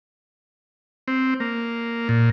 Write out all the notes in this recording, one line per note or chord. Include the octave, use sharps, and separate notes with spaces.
C4
A#3
A#2